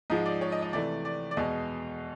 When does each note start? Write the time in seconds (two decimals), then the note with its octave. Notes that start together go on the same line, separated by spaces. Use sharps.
0.10 G#2 F3 G#3 D#5
0.26 D5
0.41 C#5
0.52 D#5
0.62 D#5
0.73 C3 E3 A3 D5
1.05 D5
1.31 D5
1.37 E2 B2 G#3 D#5